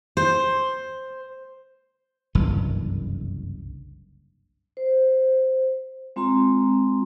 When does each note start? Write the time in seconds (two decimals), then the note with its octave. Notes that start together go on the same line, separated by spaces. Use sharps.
0.17 C5
2.35 F#1 C2 G2 E3
4.77 C5
6.16 G#3 C4 F4 A#5 C6